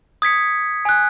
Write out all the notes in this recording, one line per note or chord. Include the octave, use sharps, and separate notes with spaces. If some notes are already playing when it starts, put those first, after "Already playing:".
D#6 G#6 B6 C#7
G#5 F#6